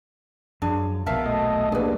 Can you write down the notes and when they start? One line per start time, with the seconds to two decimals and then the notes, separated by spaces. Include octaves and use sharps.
0.62 F#2 F3 D4 G#4
1.06 D#1 B1 B2 A#4 E5 F5 A5
1.26 A3 D#5
1.72 G3 A#3 D4 G#4 B4